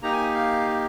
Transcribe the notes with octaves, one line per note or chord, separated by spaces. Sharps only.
A#3 D#4 G4 A#5
G#5
F5